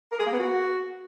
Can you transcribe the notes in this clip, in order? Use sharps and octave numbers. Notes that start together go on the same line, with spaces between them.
A#4
G#4
A#3
B3
F#4